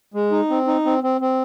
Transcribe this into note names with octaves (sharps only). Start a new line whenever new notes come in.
G#3
D#4
C4
D#4
C4
C4
C4